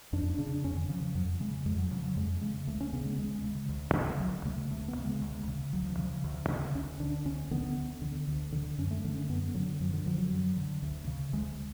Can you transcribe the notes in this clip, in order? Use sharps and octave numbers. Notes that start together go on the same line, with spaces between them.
F2 D4
D4
C#3
D4
F2 C#4
D3
C#3 F3
F3
F2 F#3
C#3 G#3
F2 G#3
F#3
C#3 F3
F#3
F2 G#3
C#3 G#3
D2 A3
C#4
C#3 B3
G#3
D2 G#3
C#3
D2
C#3
D2 F#3
C#3 A3
D2 A3
B3
C#3
G#3
D2
C#3
D2 F#3
F3
C#3 F3
D2
C#3
D2 C#4
D3 D4
D2 C#4
D3 B3
D2
D3
D2
D3
F#2 C#4
A3
D3 A3
C#4
F#2 B3
D3 F#3
F#2 F3
D3
D3 F3
F#3
F#2
D3
D2
C#3
D2 G#3